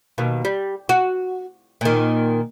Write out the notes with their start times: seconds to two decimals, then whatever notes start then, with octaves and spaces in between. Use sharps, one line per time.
0.18 D#2 B2 D#3
0.45 G3
0.89 F#4
1.81 A#2 D#3